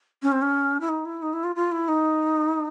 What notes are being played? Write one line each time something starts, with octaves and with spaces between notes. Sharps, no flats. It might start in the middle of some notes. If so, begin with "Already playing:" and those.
C#4
C4
C#4
E4
D#4
E4
D#4
E4
F4
F4
E4
D#4